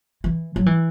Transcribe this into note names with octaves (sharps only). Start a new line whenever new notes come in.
E3
F#3
E3